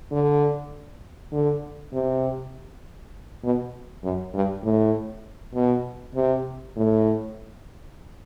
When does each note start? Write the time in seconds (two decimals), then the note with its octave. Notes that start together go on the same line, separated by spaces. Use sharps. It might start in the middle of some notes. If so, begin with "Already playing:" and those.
0.12 D3
1.33 D3
1.93 C3
3.44 B2
4.04 F#2
4.34 G2
4.64 A2
5.55 B2
6.15 C3
6.77 A2